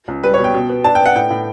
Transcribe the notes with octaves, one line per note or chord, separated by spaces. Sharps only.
C#2
G3 B4
C#5
B2
G5
B2
B3
D4 A5
G5
B3
F#5
A2 G5
A2